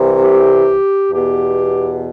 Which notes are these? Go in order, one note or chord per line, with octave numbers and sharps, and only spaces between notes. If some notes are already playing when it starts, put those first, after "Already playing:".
Already playing: C2 C3 E3
G4
E2 B2 G4